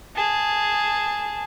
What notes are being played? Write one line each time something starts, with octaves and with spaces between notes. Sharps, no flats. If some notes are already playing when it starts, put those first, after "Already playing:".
G#4 A5